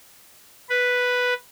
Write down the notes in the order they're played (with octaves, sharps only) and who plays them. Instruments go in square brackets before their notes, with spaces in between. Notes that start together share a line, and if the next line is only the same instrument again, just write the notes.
[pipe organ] B4